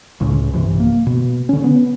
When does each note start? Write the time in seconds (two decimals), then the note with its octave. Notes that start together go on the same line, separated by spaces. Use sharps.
0.20 C#2 A2 C#3
0.54 A#1 G2 C3 E3
0.80 A#3
1.06 B2
1.49 D3 C#4
1.64 B3